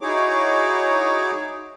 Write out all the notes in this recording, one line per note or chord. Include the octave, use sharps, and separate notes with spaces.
D#4 E4 F#4 G#4 C#5 D6